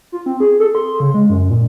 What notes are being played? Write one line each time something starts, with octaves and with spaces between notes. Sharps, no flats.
F4
C4
G#4
A4
C6
C#3
G#3
F#2
A#2